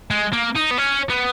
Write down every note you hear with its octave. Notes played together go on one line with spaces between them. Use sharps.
G#3
A#3
D#4
B3
C#4
B3